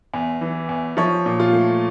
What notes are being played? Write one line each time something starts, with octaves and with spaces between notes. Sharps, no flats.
E2
E3
E2
F3 C#5
A#2
F4
A3